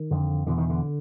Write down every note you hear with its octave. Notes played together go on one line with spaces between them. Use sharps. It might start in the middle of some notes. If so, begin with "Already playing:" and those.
Already playing: D#3
F2 D3
E2 B2 D3
D#3
D3